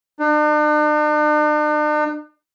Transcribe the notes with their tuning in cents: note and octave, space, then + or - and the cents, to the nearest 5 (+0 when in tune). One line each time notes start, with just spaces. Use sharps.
D4 +45